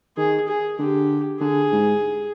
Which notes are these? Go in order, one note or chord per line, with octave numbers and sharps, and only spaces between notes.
D#3 G#4
G#4
D3 G4
D3 G#4
G#2